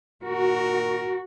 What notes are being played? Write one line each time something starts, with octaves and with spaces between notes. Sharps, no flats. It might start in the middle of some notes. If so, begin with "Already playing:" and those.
A#2 D#3 F#4 A#4